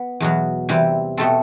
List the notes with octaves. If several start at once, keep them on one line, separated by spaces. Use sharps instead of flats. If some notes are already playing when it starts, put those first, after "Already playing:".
Already playing: B3
E2 B2 F#3
C3 E3 G3 C4
B2 A3 C4 A4